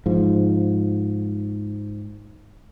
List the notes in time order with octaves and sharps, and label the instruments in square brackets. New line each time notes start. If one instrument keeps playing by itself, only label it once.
[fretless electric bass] G#2 F3